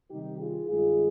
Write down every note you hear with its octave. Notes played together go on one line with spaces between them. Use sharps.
C3 D#3 G3 D#4 G4
F4 G#4
G2 D#3 G#3 F4 G#4